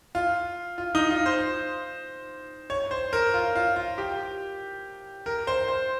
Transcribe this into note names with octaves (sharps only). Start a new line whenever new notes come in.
F4
F4
D#4
F4
C5
C#5
C5
A#4
F4
F4
F4
G4
A#4
C5
C5